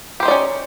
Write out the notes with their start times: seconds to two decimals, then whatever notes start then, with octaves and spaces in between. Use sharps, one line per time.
0.20 G4
0.23 C5
0.25 D#4
0.28 D5
0.31 C#4